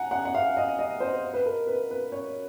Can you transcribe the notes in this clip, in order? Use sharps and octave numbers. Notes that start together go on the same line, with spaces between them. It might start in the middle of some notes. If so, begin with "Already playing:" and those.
Already playing: F#5 G#5 A#5
F#5
F#5
F5
D#5
D#5
C5
B4
A#4
B4
B4
C#5